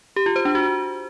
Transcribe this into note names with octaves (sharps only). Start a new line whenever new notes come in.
G4
F4
C5
D4
F#4